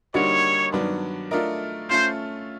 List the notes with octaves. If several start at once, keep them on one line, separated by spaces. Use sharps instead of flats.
D3 G3 A#3 D#4 F#4 C#5
G2 D#3 F#3 B3 D4
A3 D4 F4 A#4 D#5
A3 C#4 F4 C5